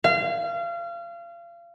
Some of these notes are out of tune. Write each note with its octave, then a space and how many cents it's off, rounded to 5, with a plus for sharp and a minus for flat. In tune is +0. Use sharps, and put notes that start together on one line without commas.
F5 -30